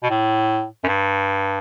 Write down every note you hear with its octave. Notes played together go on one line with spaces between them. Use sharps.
B2
A2
F#2
G2